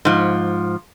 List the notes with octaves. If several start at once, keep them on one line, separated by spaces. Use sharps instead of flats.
G#2 F3